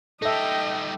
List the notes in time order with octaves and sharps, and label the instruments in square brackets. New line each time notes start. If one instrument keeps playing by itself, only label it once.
[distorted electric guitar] G3 D#4 [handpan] A4 E5 [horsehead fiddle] D#5 G5